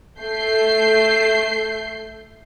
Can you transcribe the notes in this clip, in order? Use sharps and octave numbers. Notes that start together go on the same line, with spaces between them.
A3 G6 C7